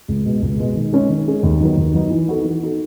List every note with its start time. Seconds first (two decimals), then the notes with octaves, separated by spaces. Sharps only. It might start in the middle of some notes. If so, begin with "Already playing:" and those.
0.08 C#2
0.25 B2 G#3 B3
0.42 C#2
0.58 B2 G#3 B3
0.76 D#3
0.93 G#3 C#4 G#4
1.09 D#3
1.26 G#3 C#4 G#4
1.43 D#2
1.61 D#3 F#3 B3 D#4
1.77 D#2
1.94 D#3 F#3 B3 D#4
2.10 E3
2.27 B3 D#4 F#4 A4
2.44 E3
2.61 B3 D#4 F#4 A4